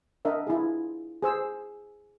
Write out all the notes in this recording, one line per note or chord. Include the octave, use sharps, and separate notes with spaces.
D4 A#4 D#5 E5 F#5
E4 F4 G#4
G#4 C5 E6